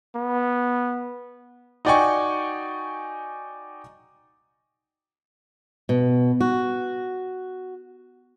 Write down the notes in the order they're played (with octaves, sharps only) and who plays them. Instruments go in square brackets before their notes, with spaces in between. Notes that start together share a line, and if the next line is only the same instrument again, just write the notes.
[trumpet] B3
[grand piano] D#4 F#4 D5 G5 G#5 C#6
[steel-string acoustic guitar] B2
F#4